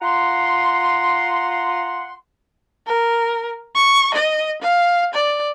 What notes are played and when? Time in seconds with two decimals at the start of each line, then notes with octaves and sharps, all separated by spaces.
0.02 F4 F#5 A#5 C6
2.87 A#4
3.75 C#6
4.15 D#5
4.62 F5
5.14 D5